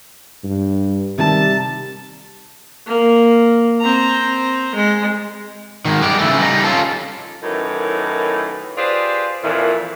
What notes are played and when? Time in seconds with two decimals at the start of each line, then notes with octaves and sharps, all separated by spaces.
0.44 G2
1.18 C3 D#3 G3 A5
2.87 A#3
3.81 C4 A#5
4.75 G#3
5.85 G#2 D#3
6.02 G3 G#3 G4
6.19 C#3 E3 A3
6.38 G3 D#4
6.64 C#4 F4 A4
7.43 F#2 A2 D#3 E3 D#4
8.78 F4 G4 G#4 B4 C5 D5
9.44 F2 A#2 E3